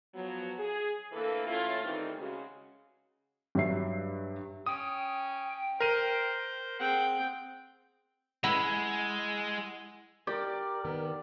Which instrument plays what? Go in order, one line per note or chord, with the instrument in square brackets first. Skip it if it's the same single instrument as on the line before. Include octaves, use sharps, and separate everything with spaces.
[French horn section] F3 F#3 B3
G#4
D2 E3 A#3 A4 B4
A2 A3 C#4 E4 F4
D#3 E3 G3 A3 C4 D#4
C#3 G#3 F#4
[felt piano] G2 F#3 E5 C7
[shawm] C#4 [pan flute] G5 [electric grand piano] D#6
[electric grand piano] A#4 D#7 [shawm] C5
[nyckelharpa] C4 G5 [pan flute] G#4 [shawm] F#5
[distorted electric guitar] G#3 [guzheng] E4 B5 [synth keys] F#5 E6
[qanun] G4 [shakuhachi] A#4 [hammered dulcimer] D5
[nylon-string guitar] D#3 B3